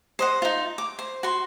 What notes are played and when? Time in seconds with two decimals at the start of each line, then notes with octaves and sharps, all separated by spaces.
0.19 C5 D#5 F#5
0.42 D#4 F4
0.78 D6
0.99 C5
1.23 F#4 C6